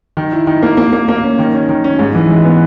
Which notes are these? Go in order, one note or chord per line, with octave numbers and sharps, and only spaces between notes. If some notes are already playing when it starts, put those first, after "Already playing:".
D#3
E4
D#3
A#3
A#3
A#3
A#3
C#4
D#3
C#4
D#3
C#4
G#2
E3
G#3
B3